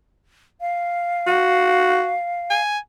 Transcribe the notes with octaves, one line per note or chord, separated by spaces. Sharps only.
F5
F#4
G#5